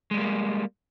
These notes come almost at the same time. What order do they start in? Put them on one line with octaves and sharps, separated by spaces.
G#3 G3 A#3